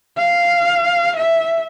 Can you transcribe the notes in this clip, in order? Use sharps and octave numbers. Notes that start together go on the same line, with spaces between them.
F5
E5